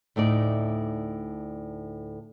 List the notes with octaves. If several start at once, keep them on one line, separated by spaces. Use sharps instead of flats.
D2 A2 D#4 D5